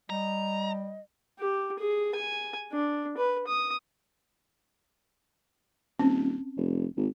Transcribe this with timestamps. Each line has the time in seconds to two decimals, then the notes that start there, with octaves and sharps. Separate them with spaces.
0.10 G3 D#5 A#5
1.39 G4
1.79 G#4
2.15 G#5
2.73 D4
3.17 B4
3.47 D#6
5.99 D#1 C4 C#4
6.57 F1
6.97 G#1